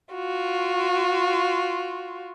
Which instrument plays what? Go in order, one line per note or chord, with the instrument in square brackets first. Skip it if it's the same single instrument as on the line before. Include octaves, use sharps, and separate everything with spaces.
[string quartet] F4 F#4